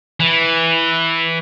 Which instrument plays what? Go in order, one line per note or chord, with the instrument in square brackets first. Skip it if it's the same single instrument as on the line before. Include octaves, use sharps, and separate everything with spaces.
[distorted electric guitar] E3